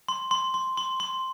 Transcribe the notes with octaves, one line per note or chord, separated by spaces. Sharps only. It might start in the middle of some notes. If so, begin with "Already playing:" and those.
C6
C6
C6
C6
C6